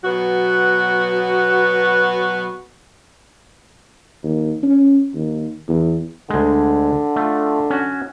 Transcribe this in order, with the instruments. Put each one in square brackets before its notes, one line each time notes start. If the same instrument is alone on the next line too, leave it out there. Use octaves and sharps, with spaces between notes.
[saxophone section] B2 F#3 B3 F#4
[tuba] D#2
C#4
D#2
E2
[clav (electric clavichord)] D2 G#3 [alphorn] D3
[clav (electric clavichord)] A3 F4
C#4 F#4